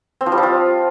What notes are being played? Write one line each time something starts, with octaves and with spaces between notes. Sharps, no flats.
C4
F3
G3
F3
F4